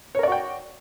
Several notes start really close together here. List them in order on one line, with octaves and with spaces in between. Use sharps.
C#5 A#4 D5 F#4 G5